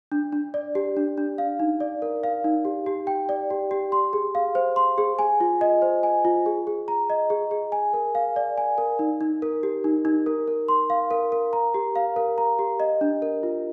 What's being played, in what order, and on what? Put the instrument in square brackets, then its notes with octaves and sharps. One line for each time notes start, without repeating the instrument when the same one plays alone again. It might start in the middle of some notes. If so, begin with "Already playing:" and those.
[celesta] D4
D4
D5
G4
D4
D4
F5
D#4
D5
A#4
F5
D#4
G4
G4
G5
D5
G4
G4
C6
G#4
F5
C5
C6
G#4
G#5
F4
D#5
C5
G#5
F4
G#4
G#4
A#5
D#5
G#4
G#4
G#5
A#4
F5
D5
G#5
A#4
D#4
D#4
A#4
G4
D#4
D#4
A#4
A#4
C6
F5
A#4
A#4
A#5
G4
F5
A#4
A#5
G4
D#5
D4
A#4
F4